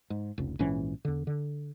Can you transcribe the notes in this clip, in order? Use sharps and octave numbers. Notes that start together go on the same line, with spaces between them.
G#2
F1 C#2
A#1 G#2 E3 C#4
E2 D3
D3